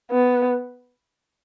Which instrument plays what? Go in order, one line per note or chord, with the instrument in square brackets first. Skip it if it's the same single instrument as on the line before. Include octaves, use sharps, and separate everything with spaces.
[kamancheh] B3